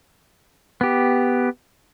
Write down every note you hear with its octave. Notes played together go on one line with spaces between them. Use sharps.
B3 G4